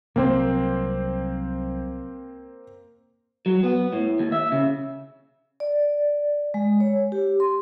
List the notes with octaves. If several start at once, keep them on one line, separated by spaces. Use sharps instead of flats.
C2 F#3 A#3 C4 C5
F#3
B3
A2
D#2
E5
C#3
D5
G#3
C#5
G4
C6